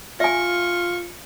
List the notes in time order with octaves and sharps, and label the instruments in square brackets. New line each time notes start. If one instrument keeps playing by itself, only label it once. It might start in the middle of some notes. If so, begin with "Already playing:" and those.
[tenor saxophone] F4 [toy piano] E5 G#5 [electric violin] C#6